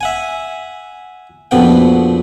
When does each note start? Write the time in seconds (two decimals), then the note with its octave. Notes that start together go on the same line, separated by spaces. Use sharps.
0.01 E5 F#5 G#5
1.51 A#1 F2 B2 B3 F#5 G5